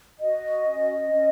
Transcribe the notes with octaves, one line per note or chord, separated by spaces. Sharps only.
F#4 D#5
C#4
C#4